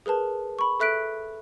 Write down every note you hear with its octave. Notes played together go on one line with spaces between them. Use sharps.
G#4 A#4 B4 A5
B5 C#6
A4 E5 F#6 B6 D7